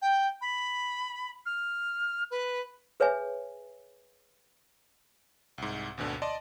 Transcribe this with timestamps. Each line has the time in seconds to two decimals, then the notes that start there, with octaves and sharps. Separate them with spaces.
0.01 G5
0.41 B5
1.45 F6
2.30 B4
3.00 G#4 B4 C#5 E5 G#5
5.58 C2 G#2
5.97 G#1 D2 B2 D3
6.22 D5 D#5 A5 C6